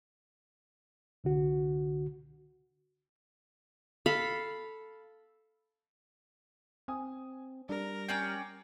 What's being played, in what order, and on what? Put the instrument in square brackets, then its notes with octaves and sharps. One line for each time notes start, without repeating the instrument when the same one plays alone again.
[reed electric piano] C2 D3 F#4
[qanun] A4 F5 B5
[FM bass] C4 [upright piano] G#5 D#6
[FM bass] G3 [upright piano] D4 [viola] A#4
[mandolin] C#4 D5 G5 [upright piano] C7